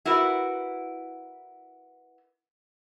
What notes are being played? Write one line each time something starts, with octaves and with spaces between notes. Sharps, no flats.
E4 F#4 A#4 B4